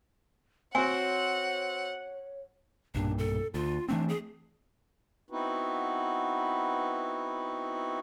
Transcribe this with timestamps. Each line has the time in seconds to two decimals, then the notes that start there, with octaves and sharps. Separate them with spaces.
0.75 C4 F#4 C#5 F#5 G#5
2.95 B1 G2 A#2 D4
3.18 A4
3.54 D2 F4
3.88 E3 A3 C4 D4
4.09 G#4
5.30 B3 C4 D#4 E4 F#4 B4